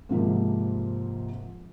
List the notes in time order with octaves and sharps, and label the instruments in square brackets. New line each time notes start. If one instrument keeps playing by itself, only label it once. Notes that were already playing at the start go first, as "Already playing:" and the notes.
[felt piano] G#2 C3 F3 A#3